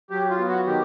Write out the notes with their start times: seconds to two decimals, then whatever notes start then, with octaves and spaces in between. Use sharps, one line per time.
0.10 F#3 G4
0.30 F4
0.39 B3
0.48 F#4
0.67 D#3 G4